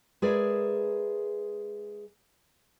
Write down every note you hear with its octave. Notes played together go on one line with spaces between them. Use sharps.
G#3 G#4 A#4 B4 D5 E5